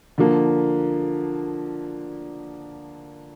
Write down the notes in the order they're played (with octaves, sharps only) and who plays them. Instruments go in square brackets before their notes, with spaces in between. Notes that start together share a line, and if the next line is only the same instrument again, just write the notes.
[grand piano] D3 F3 A#3